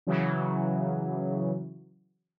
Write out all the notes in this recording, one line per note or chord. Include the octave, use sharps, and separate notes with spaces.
C#3 E3 F#3